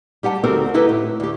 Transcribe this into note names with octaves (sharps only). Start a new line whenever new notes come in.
G3 G4 F#5 G#5 A5
D2 C4 D#4 F#4 A4 A#4
D#4 E4 G4 A4 B4
A2
D2 G4